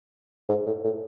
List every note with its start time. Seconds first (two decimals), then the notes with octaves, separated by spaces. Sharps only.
0.49 G#2
0.66 A2
0.84 A2